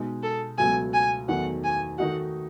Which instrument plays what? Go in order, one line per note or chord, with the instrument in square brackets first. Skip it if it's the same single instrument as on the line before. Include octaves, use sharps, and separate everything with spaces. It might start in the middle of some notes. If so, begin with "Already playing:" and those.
Already playing: [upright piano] B2 G#3 D#4
[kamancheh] A4
[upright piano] C#2 B2 F#3 A3 [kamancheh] G#5
[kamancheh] G#5
[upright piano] E2 D#3 F#3 A3 [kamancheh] F#5
[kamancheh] G#5
[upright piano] D#3 A3 D#4 F#4 [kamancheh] F#5